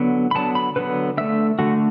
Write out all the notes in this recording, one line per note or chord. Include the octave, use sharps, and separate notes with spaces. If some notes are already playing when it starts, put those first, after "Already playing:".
Already playing: D3 F#3 B3
B5
D3 F#3 B3 A5
B5
D3 F#3 B3 B4
D3 A3 E5
D3 A3 F#4